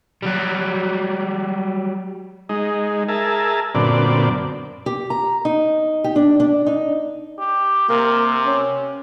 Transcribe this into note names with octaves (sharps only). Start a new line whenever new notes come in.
F#3 G3
G#3 D#4
G#4 A#4 E5 A5
F#2 A#2 D3 B3 C4 D5
G4
A#5
D#4
G4
D4
D4
D#4
G4
C3 A#3
C#4